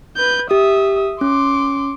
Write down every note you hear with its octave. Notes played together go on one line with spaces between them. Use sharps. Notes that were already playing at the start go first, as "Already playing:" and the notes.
B4 G6
G4 E5 D#6
C#4 C6 D6